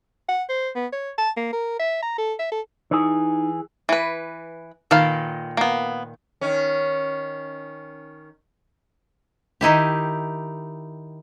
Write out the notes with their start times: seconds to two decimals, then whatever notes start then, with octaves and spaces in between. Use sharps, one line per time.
0.29 F#5
0.49 C5
0.76 B3
0.93 C#5
1.18 A5
1.37 A#3
1.53 A#4
1.80 E5
2.03 A#5
2.18 A4
2.39 E5
2.52 A4
2.91 E3 D#4 G#4
3.89 E3 B4
4.91 A#2 D#3 A4 B4 F5
5.57 A#3 B3
6.41 D#3 C#4
9.61 D#3 D#4 E4 G4